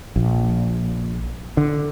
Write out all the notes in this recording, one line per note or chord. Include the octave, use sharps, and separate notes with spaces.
A#1
D3